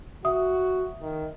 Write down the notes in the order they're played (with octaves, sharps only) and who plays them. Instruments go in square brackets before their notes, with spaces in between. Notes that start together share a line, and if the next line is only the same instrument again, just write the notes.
[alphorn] F#4 [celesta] E5 D#6
[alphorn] D#3